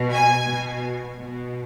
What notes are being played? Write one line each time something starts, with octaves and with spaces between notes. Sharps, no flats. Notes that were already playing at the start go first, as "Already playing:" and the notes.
Already playing: B2
G#5
B2
B2